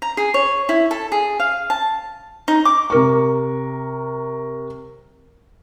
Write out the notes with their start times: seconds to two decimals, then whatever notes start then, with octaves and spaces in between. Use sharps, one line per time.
0.02 A#5
0.17 G#4
0.34 C#5
0.69 E4
0.91 A4
1.12 G#4
1.40 F5
1.70 A5
2.48 D#4
2.65 D6
2.90 C3 A#4 C#6